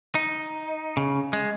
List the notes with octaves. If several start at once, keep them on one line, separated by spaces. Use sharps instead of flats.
D#4
C#3
G#3